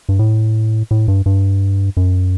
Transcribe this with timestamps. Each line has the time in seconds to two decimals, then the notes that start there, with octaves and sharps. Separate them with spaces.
0.09 G2
0.19 A2
0.91 A2
1.08 G2
1.26 G2
1.97 F#2